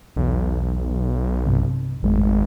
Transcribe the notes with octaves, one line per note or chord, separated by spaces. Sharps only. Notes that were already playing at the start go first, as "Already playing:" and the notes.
B1 E2
G2 C3
G#1 F2 G#3 A3